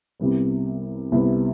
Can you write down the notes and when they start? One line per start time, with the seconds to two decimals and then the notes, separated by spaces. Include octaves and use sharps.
0.20 C2 C3 G3 B3
1.12 C2 C3 G3 B3